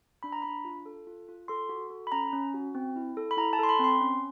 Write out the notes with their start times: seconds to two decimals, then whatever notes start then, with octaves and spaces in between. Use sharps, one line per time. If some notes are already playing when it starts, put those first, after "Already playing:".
0.23 D4 B5
0.32 A#5
0.42 D4 B5
0.65 F4
0.86 A4
1.07 F4
1.29 F4
1.48 A4 C6
1.69 F#4
1.90 A4
2.07 B5
2.12 C#4 A#5
2.33 C#4
2.54 F#4
2.75 C4
2.96 E4
3.17 A4
3.31 B5
3.37 E4 A#5
3.53 A5
3.59 A4 C6
3.69 B5
3.79 C4 C6
4.01 C#4